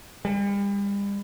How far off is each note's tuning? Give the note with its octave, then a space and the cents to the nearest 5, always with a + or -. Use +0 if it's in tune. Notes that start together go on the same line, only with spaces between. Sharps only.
G3 +40